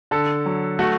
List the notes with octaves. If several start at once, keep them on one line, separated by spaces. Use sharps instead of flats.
D3 A4
F#3
A3 F#4